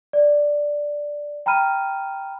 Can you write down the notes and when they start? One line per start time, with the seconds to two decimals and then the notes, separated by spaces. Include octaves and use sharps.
0.13 D5
1.46 G5 A#5 B5 F6 D#7